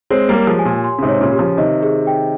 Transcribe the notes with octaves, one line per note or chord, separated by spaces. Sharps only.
G#3 C4 C#5
G3 A#3
G4
F3 G#3
G#5
A#2
C6
C#3
G#2 C3
C#5
A#2 C#3
G4
C#3 F3
C3 D#3 D#5
G#4
G5